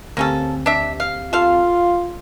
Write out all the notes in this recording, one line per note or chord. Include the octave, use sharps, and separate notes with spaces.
D2 A#3 C4 C#4 G4 A4
D4 E5
F5
F4 A4 F5